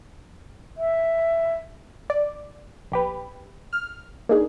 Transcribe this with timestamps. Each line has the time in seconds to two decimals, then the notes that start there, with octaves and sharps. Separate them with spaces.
0.77 E5
2.10 D5
2.92 A#1 G4 B4
3.73 F6
4.29 A#3 D4 D#4 G#4